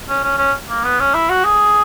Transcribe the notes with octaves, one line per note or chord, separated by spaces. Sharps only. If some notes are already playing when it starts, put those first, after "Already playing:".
C#4
C#4
C#4
A#3
B3
C#4
E4
F#4
G#4